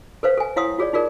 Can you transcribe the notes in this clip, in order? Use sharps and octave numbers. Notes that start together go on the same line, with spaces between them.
A4 B4 C5 F5
A4 G#5
E4 C#5 F5 F#5 C6 D#6
F4 G#4 C#5 D5
D#4 F4 G#4 A#4 D5